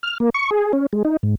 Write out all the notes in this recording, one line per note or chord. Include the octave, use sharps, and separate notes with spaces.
F6
A#3
C#6
G#4
C#4
G#3
D#4
G#2